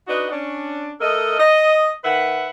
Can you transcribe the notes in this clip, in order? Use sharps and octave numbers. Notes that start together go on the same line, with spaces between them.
D4 D#4 F#4 B4 D#5
C#4 D4
A3 A4 A#4 D#5
D#5
D#3 B4 E5 F#5